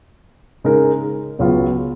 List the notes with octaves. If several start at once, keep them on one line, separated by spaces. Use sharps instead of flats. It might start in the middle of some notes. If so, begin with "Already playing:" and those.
C#3 G#3 D#4 A#4
C#2 C#3 F#3 B3 F4